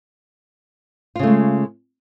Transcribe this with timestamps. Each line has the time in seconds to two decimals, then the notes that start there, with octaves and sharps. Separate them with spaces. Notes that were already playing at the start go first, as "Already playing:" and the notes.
1.16 F4
1.19 C#3
1.23 A3
1.27 G#3